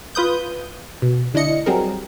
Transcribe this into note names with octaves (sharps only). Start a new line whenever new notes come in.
F4 B4 D#6 G6
B2
D2 D4 E4 D#5 C#7
F#3 G3 C4 G#4 A#4